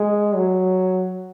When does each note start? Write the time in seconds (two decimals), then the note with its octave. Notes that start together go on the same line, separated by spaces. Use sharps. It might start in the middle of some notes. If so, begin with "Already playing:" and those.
Already playing: G#3
0.35 F#3